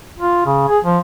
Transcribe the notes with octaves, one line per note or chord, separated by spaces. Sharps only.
F4
C#3
G#4
F3